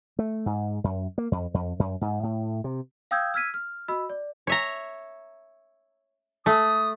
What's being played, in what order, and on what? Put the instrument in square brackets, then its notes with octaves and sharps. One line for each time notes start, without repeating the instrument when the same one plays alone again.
[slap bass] A3
G#2
F#2
A#3
F2
F2
F#2
G#2
A2
C3
[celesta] F5 G5 D#6 E6 G6 G#6
E6 F6 G#6 B6 D#7
F6
F#4 D#5 B5 E6
D5
[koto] C#5 E5 A#5
[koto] A3 [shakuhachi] D#6